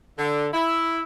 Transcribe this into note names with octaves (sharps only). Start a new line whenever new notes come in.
D3
E4